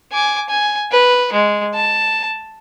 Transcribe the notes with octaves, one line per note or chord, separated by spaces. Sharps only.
G#5 D6
G#5
B4
G#3
A5